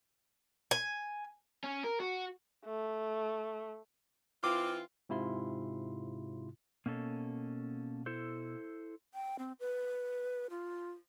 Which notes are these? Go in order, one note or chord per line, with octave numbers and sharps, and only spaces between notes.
G#5
C#4
A#4
F#4
A3
E3 C4 F4 D6
G#2 C3 E4 F4 C6
B2 A#3 C#4 A4
E4 A4 C5
G5
C4
B4
F4